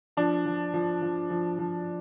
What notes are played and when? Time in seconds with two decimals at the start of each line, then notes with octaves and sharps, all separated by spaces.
0.17 F3 D4
0.46 F3
0.74 F3
1.02 F3
1.30 F3
1.59 F3